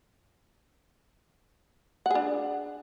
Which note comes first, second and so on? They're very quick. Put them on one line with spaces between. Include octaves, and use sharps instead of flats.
F#5 G#4 D4